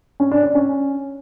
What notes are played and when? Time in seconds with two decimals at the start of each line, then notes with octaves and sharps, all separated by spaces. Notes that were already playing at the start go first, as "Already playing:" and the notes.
0.20 C#4
0.31 D4
0.43 D5
0.55 C#4